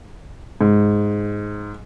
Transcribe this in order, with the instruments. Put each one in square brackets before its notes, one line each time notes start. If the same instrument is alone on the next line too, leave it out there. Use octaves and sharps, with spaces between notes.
[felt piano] G#2